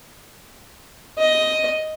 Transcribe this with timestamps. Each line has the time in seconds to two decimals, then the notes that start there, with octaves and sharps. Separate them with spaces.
1.18 D#5